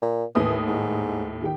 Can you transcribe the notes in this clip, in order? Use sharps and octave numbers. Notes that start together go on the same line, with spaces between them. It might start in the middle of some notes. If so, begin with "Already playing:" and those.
A#2
D#2 A2 E3 D#6
G#2
D#3 G4 G5